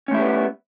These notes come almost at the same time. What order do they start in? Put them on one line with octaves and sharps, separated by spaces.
C#4 A3 E4 G3 B3